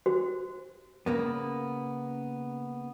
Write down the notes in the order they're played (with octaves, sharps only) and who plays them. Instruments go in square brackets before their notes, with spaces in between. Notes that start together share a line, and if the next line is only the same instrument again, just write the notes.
[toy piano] F#4 C5
[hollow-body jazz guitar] C#3 A#3 B3